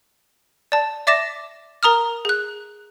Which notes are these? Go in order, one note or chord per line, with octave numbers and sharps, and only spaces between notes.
D5 A5
D5 E5 D6 A6 A#6 E7
A#4 A#5 D#6 F6
G#4 F#6